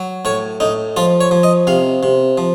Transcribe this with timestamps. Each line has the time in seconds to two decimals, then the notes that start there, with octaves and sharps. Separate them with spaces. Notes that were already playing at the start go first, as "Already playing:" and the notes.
Already playing: F#3
0.25 A2 C#5
0.60 A2 D#4
0.97 F3 F4
1.21 C#5
1.31 F3
1.43 D#5
1.67 C3 F5
2.03 C3
2.38 F3